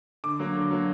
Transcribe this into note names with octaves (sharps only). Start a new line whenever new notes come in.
D3 D6
F#3 A#3
D3
F#3 A#3